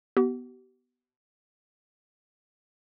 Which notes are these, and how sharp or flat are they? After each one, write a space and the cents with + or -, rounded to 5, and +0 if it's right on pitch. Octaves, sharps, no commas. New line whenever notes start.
B3 +0 G4 -40